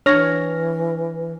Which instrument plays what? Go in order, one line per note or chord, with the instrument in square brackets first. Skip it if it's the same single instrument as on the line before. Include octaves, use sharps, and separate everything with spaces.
[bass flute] E3 [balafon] D4 [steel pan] C#5 [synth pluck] F6 A#6